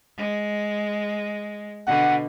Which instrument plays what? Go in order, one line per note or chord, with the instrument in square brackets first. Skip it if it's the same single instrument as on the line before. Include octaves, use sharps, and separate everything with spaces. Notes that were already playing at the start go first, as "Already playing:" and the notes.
[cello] G#3
[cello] B2 D3 [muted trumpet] F#5